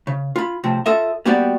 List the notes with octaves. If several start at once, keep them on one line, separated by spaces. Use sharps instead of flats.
C#3
F4 B5
A2 C3 F3 C4
F4 A4 D#5 E5
G3 A#3 B3 F#4 G4 D5